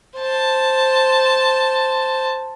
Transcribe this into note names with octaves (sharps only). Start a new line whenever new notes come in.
C5 A5